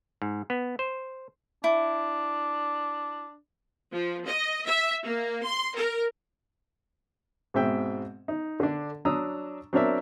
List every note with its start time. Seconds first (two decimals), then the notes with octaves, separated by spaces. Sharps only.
0.22 G#2
0.50 B3
0.79 C5
1.64 D4 E4
3.92 F3
4.26 D#5
4.65 E5
5.05 A#3
5.45 C6
5.76 A#4
7.54 G#2 B2 C4 E5 G5
8.28 D#4
8.60 D3 D4
9.05 F#3 D4 A#5 D#6 E6
9.73 F#3 C4 D4 A#4 D5 E5